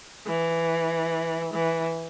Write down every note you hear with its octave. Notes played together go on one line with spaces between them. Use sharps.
E3
E3